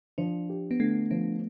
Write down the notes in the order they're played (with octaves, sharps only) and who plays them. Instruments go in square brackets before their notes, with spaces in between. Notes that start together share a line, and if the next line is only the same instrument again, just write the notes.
[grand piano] F3 [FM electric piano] D4
[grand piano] G4
[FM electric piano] B3
[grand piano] D3 [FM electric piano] A3
[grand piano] F3 [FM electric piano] B3